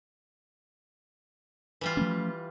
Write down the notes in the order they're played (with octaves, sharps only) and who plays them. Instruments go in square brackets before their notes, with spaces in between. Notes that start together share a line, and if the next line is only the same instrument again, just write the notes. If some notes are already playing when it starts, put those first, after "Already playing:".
[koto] E3 G3 F4
[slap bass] F3 A3 C#4